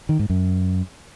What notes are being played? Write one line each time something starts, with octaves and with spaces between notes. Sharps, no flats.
D#3
G#2
F#2